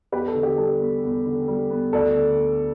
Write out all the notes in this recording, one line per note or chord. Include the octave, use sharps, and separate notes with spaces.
E2 G4 B4
A4
D3
G4
G3 A4
B3
E2
D3
G3
B3
D2 A4 D5
D3
B3